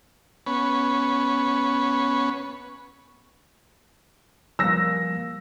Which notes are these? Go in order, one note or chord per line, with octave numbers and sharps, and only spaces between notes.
B3 C#4
F3 G3 A#3 E6 A#6